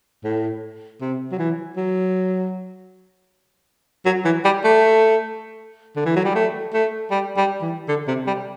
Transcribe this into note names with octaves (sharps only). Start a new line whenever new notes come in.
A2
C3
F#3
E3
F#3
F#3
E3
G3
A3
D3
E3
F#3
G3
A3
A3
G3
G3
E3
D3
C3
G3